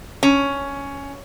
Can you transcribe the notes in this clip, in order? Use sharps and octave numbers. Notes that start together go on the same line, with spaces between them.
C#4